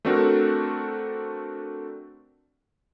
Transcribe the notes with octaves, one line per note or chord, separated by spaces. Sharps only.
A3 C4 D4 F#4 A4 A#4